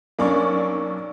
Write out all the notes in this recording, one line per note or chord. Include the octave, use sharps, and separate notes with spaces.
B1 A#3 C#4 D4 D5 C#6